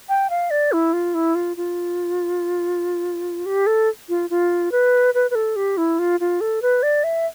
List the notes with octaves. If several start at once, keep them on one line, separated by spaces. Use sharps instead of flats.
G5
F5
D5
E4
F4
E4
F4
F4
G4
A4
F4
F4
B4
B4
B4
A4
G4
E4
F4
F4
A4
B4
D5
E5